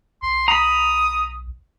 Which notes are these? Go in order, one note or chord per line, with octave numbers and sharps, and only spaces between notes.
B1 C6
A#5 B5 D#6